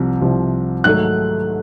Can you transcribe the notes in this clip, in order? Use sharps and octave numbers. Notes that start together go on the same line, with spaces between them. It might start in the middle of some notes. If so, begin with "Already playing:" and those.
Already playing: C2 C3 F3
C2 C3 F3
G#2 D#3 F#3 A3 F#6